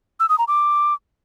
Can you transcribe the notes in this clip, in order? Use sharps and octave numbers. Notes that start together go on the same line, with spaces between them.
E6
D#6
A#5
D6